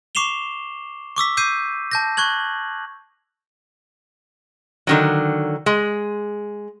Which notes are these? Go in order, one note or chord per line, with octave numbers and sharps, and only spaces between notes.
C#6 D6 C7 E7 F7 G7
C#6 D6 E6 B6
D6 E6 G6 C7 D#7
A5 G6 A#6
C#6 F#6 G#6 F#7
D3 D#3 F#3
G#3